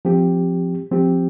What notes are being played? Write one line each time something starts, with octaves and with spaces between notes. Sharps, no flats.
F3 C4 G4
F3 C4 G4